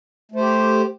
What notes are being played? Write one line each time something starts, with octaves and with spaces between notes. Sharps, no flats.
A3 G4 C5